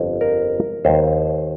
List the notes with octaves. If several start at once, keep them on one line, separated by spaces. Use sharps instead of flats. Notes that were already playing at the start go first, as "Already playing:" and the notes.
Already playing: G1 F2 F3
A#4
D#2 D#3 C5